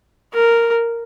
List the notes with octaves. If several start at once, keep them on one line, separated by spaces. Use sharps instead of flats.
A#4